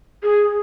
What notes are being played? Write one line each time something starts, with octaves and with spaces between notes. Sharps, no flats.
G#4